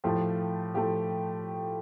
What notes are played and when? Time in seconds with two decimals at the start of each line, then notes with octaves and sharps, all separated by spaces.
0.04 A2 F3 A3 G4
0.75 A2 F3 A3 G4